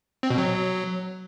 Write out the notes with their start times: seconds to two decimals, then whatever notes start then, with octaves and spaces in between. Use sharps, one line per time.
0.23 C4
0.30 B2
0.38 F#3